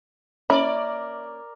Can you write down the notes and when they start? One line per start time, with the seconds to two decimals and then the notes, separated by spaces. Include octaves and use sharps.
0.50 A#3 C#4 E4 A#4 D5